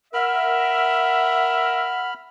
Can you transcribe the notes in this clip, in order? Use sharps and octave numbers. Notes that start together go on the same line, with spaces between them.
A#4 E5 F#5 B5 F6